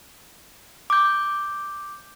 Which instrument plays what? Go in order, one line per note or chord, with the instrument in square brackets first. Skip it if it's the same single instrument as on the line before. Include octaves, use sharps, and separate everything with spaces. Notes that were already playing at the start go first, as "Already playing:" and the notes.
[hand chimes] D6 G6